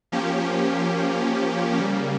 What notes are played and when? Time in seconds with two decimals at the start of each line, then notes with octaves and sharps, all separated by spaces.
0.12 F3 A#3 C#4 G4
1.78 C#3 G3 A#3